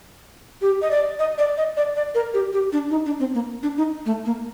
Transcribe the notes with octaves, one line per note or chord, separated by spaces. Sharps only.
G4
D#5
D5
D#5
D5
D#5
D5
D5
A#4
G4
G4
D4
D#4
D4
C4
A#3
D4
D#4
A3
A#3